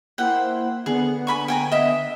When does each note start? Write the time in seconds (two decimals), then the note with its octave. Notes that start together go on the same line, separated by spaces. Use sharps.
0.18 A#3 E4 C5 F#5 G5
0.86 D3 B3 G#4 F#5
1.27 G#5 B5 C#6
1.48 G5 G#5 A#5
1.72 D#5 E5